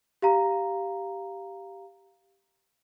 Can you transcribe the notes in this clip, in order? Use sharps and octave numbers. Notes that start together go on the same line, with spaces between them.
G4 F5 A#5